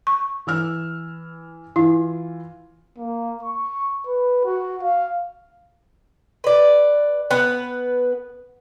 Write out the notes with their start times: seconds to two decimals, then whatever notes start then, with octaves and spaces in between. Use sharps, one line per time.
0.07 C#6
0.47 E3 E6 F6
1.76 E3 E4 F4
2.98 A#3
3.43 C#6
4.07 B4
4.45 F#4
4.83 F5
6.44 B4 D5
7.31 B3 B4